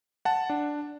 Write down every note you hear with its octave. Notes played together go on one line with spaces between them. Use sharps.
F#5 A5
D4